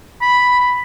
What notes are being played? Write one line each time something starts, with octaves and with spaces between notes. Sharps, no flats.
B5